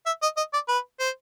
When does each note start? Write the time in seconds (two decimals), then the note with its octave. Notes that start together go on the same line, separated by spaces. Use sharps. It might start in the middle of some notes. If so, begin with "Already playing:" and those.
0.06 E5
0.22 D#5
0.37 D#5
0.54 D5
0.68 B4
1.00 C5